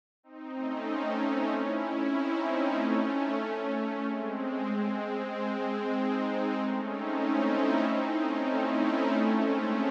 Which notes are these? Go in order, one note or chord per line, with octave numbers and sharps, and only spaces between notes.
C4 D#4
A3 C#4
A3 C#4
C#4 E4
C4 D#4
A3 C#4
G#3 C4
G#3 C4
G#3 C4
C4 D#4
A3 C#4
C4 D#4
C#4 E4
C4 D#4
A3 C#4
C#4 E4
C4 D#4
A3 C#4
G#3 C4